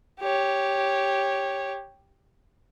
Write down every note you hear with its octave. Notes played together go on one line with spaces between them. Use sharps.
G4 C#5